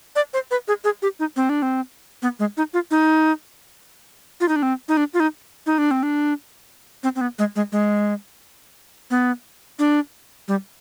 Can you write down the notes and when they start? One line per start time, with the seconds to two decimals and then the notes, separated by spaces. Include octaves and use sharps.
0.16 D5
0.34 C5
0.51 B4
0.68 G#4
0.84 G#4
1.02 G4
1.20 D#4
1.36 C4
1.49 D4
1.62 C4
2.22 B3
2.39 G#3
2.57 D#4
2.74 F4
2.91 D#4
4.40 F4
4.48 D#4
4.56 D4
4.63 C4
4.88 D#4
4.97 D4
5.14 F4
5.20 D#4
5.66 D#4
5.78 D4
5.91 C4
6.03 D4
7.03 C4
7.16 C4
7.21 B3
7.39 G#3
7.56 G#3
7.72 G#3
9.11 B3
9.79 D4
10.48 G3